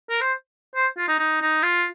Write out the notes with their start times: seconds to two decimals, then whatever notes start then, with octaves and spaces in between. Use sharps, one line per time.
0.10 A#4
0.21 C5
0.75 C5
0.98 F4
1.08 D#4
1.19 D#4
1.42 D#4
1.63 F4